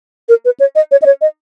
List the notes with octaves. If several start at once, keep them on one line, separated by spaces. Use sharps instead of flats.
A#4
B4
C#5
D#5
C#5
D#5
C#5
D#5